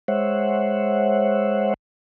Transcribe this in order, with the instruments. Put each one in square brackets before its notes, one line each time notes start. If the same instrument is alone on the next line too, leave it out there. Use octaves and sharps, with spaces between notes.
[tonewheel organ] G#3 C5 C#5 E5 F#5